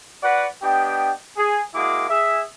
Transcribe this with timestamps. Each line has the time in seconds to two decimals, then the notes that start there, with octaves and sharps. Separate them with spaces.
0.23 F#4 B4 D5 F#5
0.62 B3 D4 G4 D#5 G5
1.37 G#4
1.74 G#3 A#3 E4 F#4 G#4 D6
2.10 G#4 E5